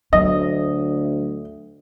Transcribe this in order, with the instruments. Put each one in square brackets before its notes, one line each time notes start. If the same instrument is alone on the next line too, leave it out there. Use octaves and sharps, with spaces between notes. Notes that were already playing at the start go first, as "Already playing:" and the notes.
[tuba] D2 [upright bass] F#3 [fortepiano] D#5